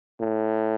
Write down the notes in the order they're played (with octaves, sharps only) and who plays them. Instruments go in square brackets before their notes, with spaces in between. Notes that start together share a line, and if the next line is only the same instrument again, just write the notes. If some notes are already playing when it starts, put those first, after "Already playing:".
[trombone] A2